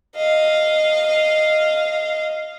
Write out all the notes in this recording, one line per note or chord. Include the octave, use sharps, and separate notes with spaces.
D#5 F5